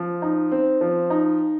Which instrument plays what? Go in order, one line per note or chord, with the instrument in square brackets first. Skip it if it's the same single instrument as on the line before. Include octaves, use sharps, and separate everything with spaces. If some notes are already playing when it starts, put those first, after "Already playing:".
Already playing: [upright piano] F3
D#4
C4
F3
D#4